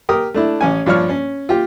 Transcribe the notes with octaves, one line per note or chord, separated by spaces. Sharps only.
G4 A#4 D#6
A3 D4 E4
A1 C#4 G#5
G2 F3 D4 C#5 F6
C#4
F4 G4